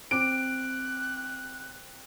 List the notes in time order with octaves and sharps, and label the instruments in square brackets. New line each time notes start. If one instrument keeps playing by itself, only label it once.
[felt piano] C4 D6 [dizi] F#6 [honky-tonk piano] D7